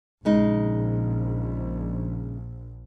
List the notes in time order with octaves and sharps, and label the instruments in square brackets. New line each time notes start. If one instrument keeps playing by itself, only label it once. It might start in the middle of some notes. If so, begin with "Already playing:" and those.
[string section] A#1 [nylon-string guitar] C#3 G#3 D#4